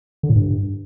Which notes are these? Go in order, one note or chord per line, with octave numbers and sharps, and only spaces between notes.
D3
A2
G2